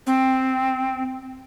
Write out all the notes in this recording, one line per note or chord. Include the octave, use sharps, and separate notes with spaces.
C4